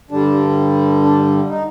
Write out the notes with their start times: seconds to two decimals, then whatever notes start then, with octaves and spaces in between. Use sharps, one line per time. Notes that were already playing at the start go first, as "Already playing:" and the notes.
0.11 G2 D3 G3 D4
1.03 D4
1.49 D#4